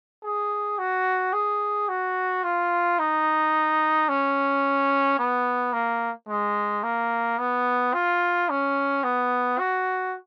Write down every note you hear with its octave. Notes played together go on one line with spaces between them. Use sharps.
G#4
F#4
G#4
F#4
F4
D#4
C#4
B3
A#3
G#3
A#3
B3
F4
C#4
B3
F#4